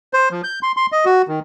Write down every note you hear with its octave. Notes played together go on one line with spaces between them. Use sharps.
C5
F3
G6
C6
C6
D#5
F#4
D#3